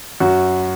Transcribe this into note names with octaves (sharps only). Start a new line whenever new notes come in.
F#2 F#4